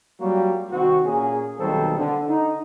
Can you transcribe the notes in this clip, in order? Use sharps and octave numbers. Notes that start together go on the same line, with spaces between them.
F#3 G3 A#3 C#4 F4 F#4
C2 D#3 C4 F#4
A#2 A#3 C#4 G#4
B1 D#3 G3 A#3 C4 A4
D3
D#4